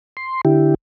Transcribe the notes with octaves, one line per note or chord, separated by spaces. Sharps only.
C6
D3 E4 G4